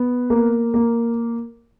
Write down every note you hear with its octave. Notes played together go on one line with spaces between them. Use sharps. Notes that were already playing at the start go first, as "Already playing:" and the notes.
Already playing: B3
A#3 A#4
A#3